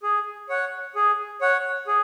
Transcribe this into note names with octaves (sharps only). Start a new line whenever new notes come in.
G#4
C#5 F#5
G#4
C#5 F#5
G#4